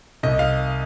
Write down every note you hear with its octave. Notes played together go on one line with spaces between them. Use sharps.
C2 D#5
F5